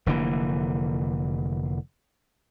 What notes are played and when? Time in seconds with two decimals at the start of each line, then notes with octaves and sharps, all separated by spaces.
0.06 F1 D3 E3 A#3